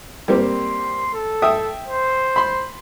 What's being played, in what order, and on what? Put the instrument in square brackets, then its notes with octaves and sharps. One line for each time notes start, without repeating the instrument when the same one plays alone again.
[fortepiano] G3 A#3 C4 [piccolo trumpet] C6
[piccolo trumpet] A4
[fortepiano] E5 G5 D#6
[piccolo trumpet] C5
[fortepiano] B5 C6